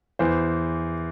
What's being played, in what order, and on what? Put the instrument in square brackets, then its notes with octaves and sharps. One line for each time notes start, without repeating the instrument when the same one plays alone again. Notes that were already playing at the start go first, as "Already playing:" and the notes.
[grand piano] E2 E3 C5